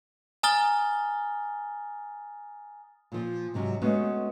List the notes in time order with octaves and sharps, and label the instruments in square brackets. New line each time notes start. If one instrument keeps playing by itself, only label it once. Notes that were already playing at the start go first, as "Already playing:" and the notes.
[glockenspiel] G#5 A#5 D#6 F6 A6 G7
[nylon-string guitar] A#2 F3
G#2 C3 F#3 C#4
G#3 A3 B3 C#4 F#4